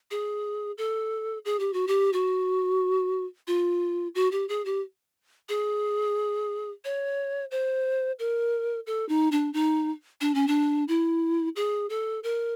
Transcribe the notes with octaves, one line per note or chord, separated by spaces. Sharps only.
G#4
A4
G#4
G4
F#4
G4
F#4
F4
F#4
G4
G#4
G4
G#4
C#5
C5
A#4
A4
D#4
D4
D#4
D4
C#4
D4
E4
G#4
A4
A#4